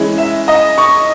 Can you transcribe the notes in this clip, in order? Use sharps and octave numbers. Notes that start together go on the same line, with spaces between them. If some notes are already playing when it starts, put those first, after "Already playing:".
Already playing: E3 G#3 C#4 E4
E5
D#5
C#6